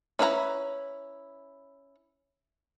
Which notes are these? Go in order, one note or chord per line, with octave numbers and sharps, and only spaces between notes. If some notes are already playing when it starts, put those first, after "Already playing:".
C#4 E4 B4 E5 A#5